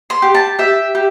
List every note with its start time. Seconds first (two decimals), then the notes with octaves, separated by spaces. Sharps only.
0.10 C6
0.22 G4
0.35 A5
0.59 G4 E5
0.95 G4